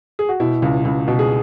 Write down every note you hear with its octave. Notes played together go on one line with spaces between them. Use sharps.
G#4
F#4
B2 E4
C#2
C#2
B2
G#4